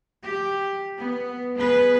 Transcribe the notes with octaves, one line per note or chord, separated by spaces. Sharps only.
G4
B3
B3 G#4 B4